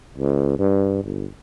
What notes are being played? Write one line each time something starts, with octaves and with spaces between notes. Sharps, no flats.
C#2
G2
G1